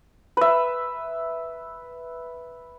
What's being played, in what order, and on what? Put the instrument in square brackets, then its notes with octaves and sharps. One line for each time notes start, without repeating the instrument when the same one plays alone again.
[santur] B4 E5